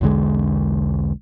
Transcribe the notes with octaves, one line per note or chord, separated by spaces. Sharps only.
B1 E2 D3 G#3